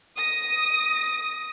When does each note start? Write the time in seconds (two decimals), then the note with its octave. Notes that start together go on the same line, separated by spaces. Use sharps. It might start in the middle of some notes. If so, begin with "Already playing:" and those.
0.16 D#6 A#6